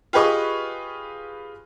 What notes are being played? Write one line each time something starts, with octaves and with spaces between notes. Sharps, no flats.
F4 G4 G#4 B4 D#5 C#6